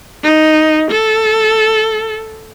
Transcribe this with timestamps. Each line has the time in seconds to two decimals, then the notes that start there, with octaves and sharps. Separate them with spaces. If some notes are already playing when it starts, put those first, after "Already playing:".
0.24 D#4
0.90 A4